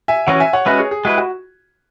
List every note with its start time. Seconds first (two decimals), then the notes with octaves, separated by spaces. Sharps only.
0.08 E5 G#5
0.27 E3 C#4 F#4 C#5 F#5
0.40 E5 G#5
0.53 C#5 F#5
0.66 G#3 C#4 F#4 B4 E5
0.78 G#4 C#5
0.91 G#4
1.05 G#3 E4 F#4 B4
1.18 F#4